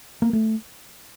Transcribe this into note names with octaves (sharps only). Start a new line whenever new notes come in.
A#3
A3